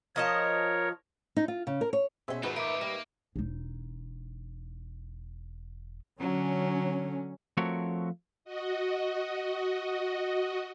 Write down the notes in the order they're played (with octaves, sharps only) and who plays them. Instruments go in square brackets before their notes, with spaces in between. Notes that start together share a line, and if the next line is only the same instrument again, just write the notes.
[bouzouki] F3 D#5 A5 [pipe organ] A#4 C#5
[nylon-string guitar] D#4
F4
C#3
A#4
C#5
[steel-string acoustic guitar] B2 C#4 [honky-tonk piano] G#4 C5 E5
[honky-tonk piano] G#1 D#4 B4 [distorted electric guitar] A3 F4 [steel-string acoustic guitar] F#4 G#4
[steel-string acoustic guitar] A#4 E5 [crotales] D6 D7
[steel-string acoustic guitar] G3 [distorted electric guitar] A#3
[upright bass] E1 D#4
[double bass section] D3 C#4 [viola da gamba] F#3
[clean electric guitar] F3 A3 C4 F#4 A#4 C#5
[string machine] F#4 D#5